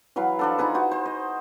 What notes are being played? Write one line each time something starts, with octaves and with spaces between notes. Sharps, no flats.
E3 F#3 B4 F5
F3 D4 A4
D#4 F4 G#4 B4
F#4 C5
C5
D#5